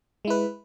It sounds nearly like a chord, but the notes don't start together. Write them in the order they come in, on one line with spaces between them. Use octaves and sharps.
G#3 E4 B4